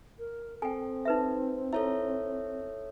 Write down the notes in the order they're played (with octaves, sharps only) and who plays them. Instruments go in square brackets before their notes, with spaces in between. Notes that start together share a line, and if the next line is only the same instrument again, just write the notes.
[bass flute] A#4
[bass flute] C4 [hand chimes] A4 [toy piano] G5 G#5
[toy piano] D#4 B4 E5
[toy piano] E4 [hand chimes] A4 C#5 E5